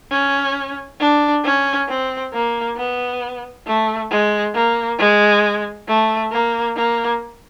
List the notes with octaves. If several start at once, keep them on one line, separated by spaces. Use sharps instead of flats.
C#4
D4
C#4
C4
A#3
B3
A3
G#3
A#3
G#3
A3
A#3
A#3